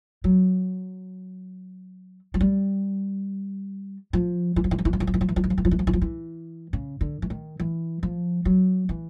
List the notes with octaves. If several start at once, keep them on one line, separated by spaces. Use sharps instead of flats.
F#3
F#3
G3
F3
E3
F3
E3
F3
E3
F3
E3
F3
E3
F3
E3
F3
E3
F3
E3
F3
E3
F3
E3
F3
E3
C#3
D3
E3
D#3
E3
F3
F#3
E3